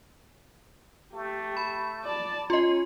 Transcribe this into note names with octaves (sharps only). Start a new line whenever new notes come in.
A3 G4
B5
D5 A5
C#4 F4 D#5 C6